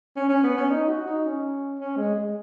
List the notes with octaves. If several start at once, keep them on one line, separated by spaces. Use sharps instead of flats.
C#4
C#4
B3
C#4
D#4
F#4
D#4
C#4
C#4
G#3
G#3